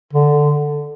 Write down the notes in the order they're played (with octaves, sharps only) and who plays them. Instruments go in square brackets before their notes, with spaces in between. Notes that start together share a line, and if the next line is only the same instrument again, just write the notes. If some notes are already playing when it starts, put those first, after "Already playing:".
[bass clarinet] D3